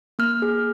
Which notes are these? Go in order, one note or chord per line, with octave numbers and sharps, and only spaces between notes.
A#3 F6
G#4